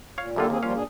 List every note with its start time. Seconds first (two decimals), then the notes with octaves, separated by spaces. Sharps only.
0.18 A#2 C#5 F5
0.36 F#2 D3 A#3 D4 F4 G4 A4
0.50 D#2 C4 G#4
0.63 F3 G3 C#4 F4 F5
0.75 B2 D4 G#4